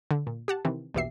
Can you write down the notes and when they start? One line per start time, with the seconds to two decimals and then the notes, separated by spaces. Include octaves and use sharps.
0.11 D3
0.27 A#2
0.48 G4 F#5 A5
0.65 C3 D#3 E3 C4
0.94 A#1 E2 B2 G4 E5 C7